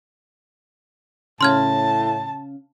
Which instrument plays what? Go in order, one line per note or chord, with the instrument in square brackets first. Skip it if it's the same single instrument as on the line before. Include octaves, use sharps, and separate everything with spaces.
[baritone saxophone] A2 [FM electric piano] C#3 C#4 F5 [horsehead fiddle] A5 [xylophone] C6 F6 G#6